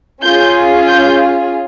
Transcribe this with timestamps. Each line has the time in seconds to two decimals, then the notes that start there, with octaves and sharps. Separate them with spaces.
0.22 C#4 F4 G#4 G6
0.88 G6